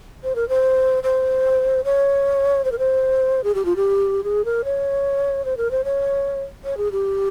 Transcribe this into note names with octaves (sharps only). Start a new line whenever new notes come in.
C5
A#4
C5
C5
C#5
C5
A#4
C5
G#4
G4
F4
G4
G#4
A#4
C#5
C5
A#4
C5
C#5
C#5
G#4
G4